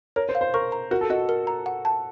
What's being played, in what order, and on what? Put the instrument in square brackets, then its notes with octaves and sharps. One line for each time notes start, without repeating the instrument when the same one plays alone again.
[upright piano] A#4 [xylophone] C#5
[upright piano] C5
[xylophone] F5
[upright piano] C5
[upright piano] A#4 [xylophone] C#6
[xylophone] A#5
[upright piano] F#4 [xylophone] A#4
[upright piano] A4
[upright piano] F#4 [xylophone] D#5
[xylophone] A#4
A#5
F#5
A5